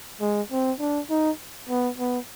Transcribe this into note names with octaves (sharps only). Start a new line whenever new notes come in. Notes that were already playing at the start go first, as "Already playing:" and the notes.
G#3
C4
D4
D#4
B3
B3